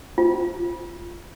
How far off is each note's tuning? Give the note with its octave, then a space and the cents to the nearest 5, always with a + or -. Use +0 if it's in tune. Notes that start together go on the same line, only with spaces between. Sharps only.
F4 -10